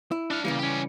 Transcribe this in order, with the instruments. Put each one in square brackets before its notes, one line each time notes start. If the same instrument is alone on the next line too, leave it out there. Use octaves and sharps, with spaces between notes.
[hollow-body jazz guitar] E4
[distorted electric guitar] D4 F5
[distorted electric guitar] A#2 [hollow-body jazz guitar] C#3 E3 G3
[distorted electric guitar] C#4 G4